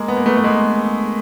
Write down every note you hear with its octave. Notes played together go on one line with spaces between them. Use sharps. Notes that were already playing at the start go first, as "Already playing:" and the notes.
Already playing: G#3 A#3
B3
A#3
A3 B3
A3
G#3 A#3